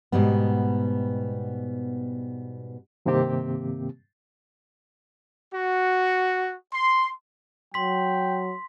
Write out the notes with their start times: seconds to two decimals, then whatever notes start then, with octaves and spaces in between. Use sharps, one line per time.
0.12 G#2 B2 G3 B3
3.06 G2 C3 D#3 A#3 C4 G4
5.52 F#4
6.72 C6
7.74 F#3 G5 C6 B6